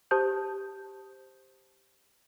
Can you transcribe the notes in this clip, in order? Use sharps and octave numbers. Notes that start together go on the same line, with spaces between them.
G4 C5 A5 D#6 G6